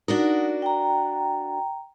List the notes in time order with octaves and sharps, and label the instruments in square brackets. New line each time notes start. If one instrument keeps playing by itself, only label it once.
[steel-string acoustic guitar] D4 F#4 A#4 [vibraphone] D#4 F#5
[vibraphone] G5 A#5